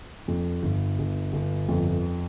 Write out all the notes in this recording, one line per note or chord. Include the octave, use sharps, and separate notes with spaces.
F2
G1
G1
G1
F2